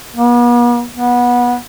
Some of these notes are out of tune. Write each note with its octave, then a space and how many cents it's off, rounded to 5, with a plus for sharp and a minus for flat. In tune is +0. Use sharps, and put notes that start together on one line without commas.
B3 -45
B3 -20